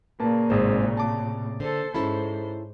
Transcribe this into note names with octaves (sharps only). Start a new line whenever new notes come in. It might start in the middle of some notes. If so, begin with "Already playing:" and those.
A#2 C#3 A#3 B4 A5
G#1 A2 C3 G#3 C5
A5 D6
D3 A4 C5
G#2 C#4 E4 A4 C5 B5